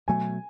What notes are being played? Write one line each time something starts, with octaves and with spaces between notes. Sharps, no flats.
B2 F#3 A3 G#5